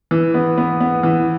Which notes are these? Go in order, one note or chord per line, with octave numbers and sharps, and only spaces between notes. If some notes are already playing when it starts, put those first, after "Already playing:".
E3
B3
B3
B3
E3